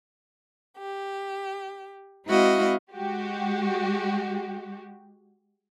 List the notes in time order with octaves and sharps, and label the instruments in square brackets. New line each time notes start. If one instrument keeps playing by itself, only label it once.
[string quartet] G4
G#3 C4 E4 F#4 D#5 F5
[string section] G#3 F#4 G4